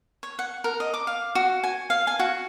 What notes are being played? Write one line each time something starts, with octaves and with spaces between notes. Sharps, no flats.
C#5
F#5
A#4
D#5
D6
F5
F#4
G#5
F5
G#5
F#4